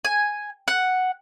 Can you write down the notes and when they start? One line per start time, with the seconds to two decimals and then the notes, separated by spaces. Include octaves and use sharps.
0.05 G#5
0.68 F#5